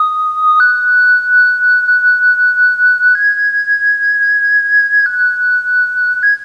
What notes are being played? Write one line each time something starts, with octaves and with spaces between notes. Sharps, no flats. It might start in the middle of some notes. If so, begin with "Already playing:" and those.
Already playing: D#6
F#6
F#6
G#6
F#6
G#6